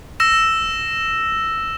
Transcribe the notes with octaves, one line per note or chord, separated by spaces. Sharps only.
E6 A#6 E7